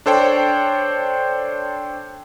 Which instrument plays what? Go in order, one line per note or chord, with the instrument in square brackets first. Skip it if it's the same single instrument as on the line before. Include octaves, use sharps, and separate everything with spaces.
[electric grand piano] D4 A4 C5 C#5 G5